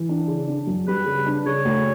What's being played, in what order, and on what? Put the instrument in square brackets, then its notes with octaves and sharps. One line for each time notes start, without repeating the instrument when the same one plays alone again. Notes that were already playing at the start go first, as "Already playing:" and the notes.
Already playing: [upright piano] E3
D4
C#3
D4
F#2
[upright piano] G3 [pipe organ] B4
[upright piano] C#3
D4
[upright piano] C#3 [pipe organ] C#5
[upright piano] D2